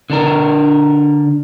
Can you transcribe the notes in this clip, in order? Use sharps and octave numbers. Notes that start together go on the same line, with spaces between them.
D3 D4 A#4